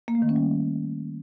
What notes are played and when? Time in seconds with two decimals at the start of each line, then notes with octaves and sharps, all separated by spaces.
0.08 A#3
0.15 A3
0.22 D#3
0.29 C#4
0.36 G3